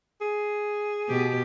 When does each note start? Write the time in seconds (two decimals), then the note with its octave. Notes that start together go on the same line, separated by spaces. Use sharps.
0.21 G#4
1.08 B2 G4